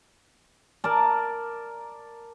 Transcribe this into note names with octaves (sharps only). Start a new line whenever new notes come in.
A#4 D5 A5